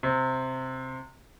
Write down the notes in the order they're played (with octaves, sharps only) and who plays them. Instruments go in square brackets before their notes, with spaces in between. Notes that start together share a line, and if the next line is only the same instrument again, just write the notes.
[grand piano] C3